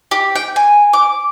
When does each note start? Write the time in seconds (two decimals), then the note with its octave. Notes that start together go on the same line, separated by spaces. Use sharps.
0.11 G4
0.35 G5
0.56 G#5
0.93 D6